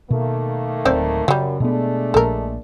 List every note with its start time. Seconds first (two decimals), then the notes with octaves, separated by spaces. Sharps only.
0.10 B2 D#3 A3 A#3
0.85 D1 C4 C5 D5
1.28 F#2 C#3 F#3 G3
1.60 B2 G#3 A3 B3 D4
2.14 A#1 A#2 A4 A#4